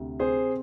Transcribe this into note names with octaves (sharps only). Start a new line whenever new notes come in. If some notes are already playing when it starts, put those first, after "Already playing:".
Already playing: D2 C3
C4 G#4 C5